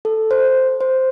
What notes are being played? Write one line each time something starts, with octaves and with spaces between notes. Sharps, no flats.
A4
C5
C5